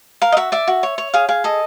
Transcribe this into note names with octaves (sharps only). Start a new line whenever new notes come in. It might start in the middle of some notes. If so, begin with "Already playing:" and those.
A#4 F5
D#5
F#4 E5
D5 E5
F#4
C#5
C#5
G#4 F5
G#4 F5
A4 D#5